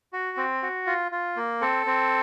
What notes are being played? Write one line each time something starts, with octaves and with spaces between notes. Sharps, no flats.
F#4
C4
F#4
F4
F4
A#3
C4 A4
C4